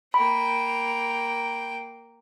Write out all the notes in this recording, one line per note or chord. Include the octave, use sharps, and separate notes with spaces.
A#3 G5 B5